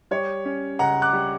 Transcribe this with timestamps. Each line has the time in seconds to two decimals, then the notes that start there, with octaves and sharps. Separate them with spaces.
0.11 G3 C#5
0.45 C#4
0.79 C#2 F#5 A#5
1.02 D6 F#6
1.13 G3